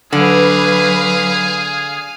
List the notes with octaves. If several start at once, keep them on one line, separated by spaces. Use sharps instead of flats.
D3 F#3 G#4 B4 F5 G#5